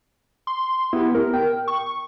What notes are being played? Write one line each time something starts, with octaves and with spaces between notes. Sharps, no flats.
C6
B3 E4 G4
A#4
G5
C#6